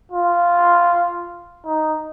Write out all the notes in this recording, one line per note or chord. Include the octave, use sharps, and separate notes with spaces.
F4
D#4